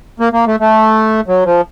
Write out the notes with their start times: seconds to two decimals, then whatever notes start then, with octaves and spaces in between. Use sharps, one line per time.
0.20 A#3
0.33 A#3
0.47 A3
0.60 A3
1.28 F#3
1.45 F3